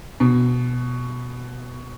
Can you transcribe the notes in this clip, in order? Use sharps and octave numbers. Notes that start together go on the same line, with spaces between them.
B2